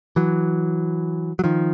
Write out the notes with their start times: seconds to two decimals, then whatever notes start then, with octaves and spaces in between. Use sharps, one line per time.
0.16 E3 F#3
1.39 F#3
1.44 D#3 F3